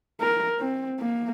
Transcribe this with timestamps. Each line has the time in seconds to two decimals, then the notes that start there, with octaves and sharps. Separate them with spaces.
0.21 A#4
0.59 C4
0.99 A#3